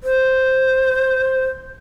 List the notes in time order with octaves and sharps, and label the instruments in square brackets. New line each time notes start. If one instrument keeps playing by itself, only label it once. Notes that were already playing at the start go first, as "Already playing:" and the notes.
[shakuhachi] C5